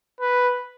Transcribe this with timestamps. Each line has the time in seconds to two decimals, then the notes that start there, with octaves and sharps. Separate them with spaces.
0.20 B4